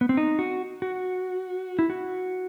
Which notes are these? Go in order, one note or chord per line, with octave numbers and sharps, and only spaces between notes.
B3
C4
D#4
F#4
F#4
E4
F#4